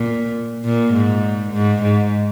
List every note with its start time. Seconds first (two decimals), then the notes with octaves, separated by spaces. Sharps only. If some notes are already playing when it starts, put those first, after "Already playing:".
Already playing: A#2
0.64 A#2
0.93 G#2
1.53 G#2
1.82 G#2